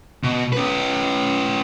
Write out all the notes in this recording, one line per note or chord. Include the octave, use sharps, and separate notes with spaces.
B2
C#4 B4